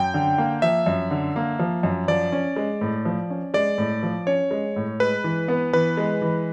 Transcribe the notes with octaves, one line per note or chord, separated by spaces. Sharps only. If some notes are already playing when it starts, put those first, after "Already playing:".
Already playing: F#2 G5
D3
A#3
F3 E5
F#2
D3
A#3
F3
F#2
F3 D5
C#4
G#3
A2
F3
C#4
G#3 D5
A2
F3
C#4 C#5
G#3
A2
G#3 B4
E3
B3
E3 B4
G#3
E3